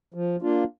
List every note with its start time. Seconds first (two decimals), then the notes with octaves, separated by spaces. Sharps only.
0.14 F3
0.42 A#3 D4 F4